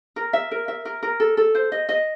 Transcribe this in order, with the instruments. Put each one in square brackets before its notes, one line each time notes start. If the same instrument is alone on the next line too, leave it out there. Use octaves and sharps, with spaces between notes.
[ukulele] A#4
E5
A#4
E5
A#4
A#4
A4
A4
C5
D#5
D#5